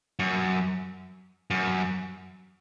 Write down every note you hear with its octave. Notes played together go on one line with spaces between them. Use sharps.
F#2
F#2